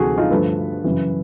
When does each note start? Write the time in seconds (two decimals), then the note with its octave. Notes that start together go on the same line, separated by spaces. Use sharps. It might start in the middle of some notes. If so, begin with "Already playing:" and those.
Already playing: D2 C3 E3 F#4 G#4 A4
0.18 D#4 F4
0.31 G2 D3 F3 A3 A4 B4
0.84 F#2 C#3 E3